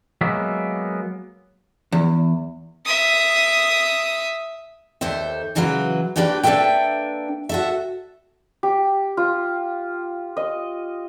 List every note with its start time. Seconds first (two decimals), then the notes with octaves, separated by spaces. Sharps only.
0.21 F#3 G#3 A#3 B3 E5
1.92 E2
2.86 E5 D#6
5.01 D#2 A4 C5 E5
5.55 C#3 E3 F#3 F4 B4
6.16 F#3 A#3 D4 G4 B4
6.43 A#3 D4 A4 B4 E5 G5
7.49 F#4 A4 E5
8.63 G4
9.17 F4
10.37 D#5